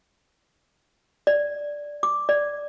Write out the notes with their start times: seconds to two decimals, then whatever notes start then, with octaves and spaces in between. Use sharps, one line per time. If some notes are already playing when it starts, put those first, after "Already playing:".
1.27 D5
2.03 D6
2.29 D5